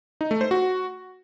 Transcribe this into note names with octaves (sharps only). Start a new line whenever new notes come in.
D#4
A3
C5
F#4